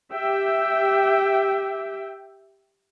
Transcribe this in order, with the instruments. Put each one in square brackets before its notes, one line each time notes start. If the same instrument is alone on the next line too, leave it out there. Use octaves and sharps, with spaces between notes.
[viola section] G4 E5 G5